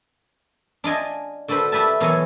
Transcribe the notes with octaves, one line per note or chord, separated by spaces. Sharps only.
D4 F4 D#5 G#5
D3 F#4 A4 B4 C5
E4 G4 B4 E5 A5
B2 E3 F#3 A4 C#5 G#5